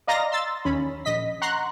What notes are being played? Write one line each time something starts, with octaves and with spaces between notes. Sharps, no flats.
D5 D#5 F5 A#5 C6 A#6
C6 E6 A6
D#2 C#4 B5
A#1 D#5 B6
F#5 A#5 C6 C#6 F#6